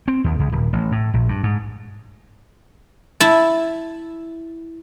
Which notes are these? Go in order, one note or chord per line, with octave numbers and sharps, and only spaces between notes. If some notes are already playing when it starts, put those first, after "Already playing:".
C4
D#2
C#2
D#1
A1
A2
A#1
G2
G#2
E4 A5